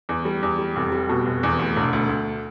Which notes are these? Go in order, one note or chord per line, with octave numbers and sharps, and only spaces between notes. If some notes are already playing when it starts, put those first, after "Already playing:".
E2
G3
E2
G3
F1
G3
B2
F1
E2
D2
E1
D2
D2